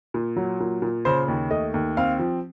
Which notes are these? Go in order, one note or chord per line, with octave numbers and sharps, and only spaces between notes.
A#2
F#3
A#2
A#2
C#3 C5
D#2
A3 D#5
D#2
C4 F5
F3